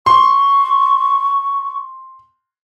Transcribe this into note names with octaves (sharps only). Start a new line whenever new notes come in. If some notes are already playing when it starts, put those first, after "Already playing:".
C6 C#6